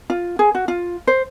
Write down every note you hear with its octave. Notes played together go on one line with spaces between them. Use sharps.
F4
G#4
F#4
F4
C5